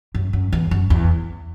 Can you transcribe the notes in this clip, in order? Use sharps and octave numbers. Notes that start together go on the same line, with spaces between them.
F#2
F#2
E2
F#2
E2